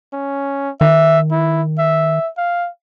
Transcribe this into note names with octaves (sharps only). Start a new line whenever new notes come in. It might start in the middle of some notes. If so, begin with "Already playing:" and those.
C#4
D#3 E5
E4
E5
F5